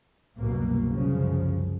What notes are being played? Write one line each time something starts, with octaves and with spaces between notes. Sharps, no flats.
C2 F#2 B2 A#3
C2 F#2 C#3 F3